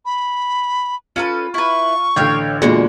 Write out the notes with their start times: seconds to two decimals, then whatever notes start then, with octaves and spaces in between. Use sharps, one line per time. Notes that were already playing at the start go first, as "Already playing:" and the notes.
0.05 B5
1.16 C#4 F4 A4 B4
1.54 E4 B4 C#6
2.16 A1 D3 C#5 F5 G5
2.62 E2 A#2 D3 G#3 F#4